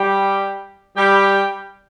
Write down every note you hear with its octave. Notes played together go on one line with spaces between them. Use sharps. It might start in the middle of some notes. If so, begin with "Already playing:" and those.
Already playing: G3 G4
G3 G4